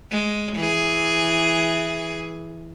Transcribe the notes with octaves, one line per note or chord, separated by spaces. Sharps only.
G#3
E3 G#4